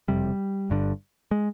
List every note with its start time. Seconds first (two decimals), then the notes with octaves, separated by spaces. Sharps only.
0.08 F#1 F2 C3 G3
0.70 G1 G2 D3
1.31 G#3